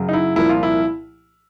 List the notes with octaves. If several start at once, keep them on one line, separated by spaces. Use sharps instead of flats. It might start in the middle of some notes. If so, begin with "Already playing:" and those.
Already playing: F#2 C#3 F#3
D#4
E4
C2 A#2 F3 A#3 E4
F4
E4